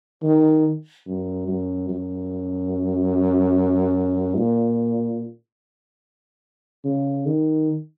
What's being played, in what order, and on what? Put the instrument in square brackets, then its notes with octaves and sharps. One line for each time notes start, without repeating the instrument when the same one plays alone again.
[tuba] D#3
F#2
F#2
F#2
A#2
C#3
D#3